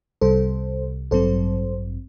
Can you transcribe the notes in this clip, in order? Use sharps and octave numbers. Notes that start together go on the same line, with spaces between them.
C2 C3 G3 A4 C5
A1 G2 F#3 C4 A4 C5